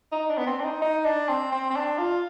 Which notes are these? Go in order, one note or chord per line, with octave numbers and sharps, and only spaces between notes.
D#4
D4
B3
C4
D4
D#4
D#4
D4
C4
C4
C4
D4
F4